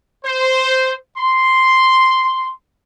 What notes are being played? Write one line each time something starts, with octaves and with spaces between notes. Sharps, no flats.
C5
C6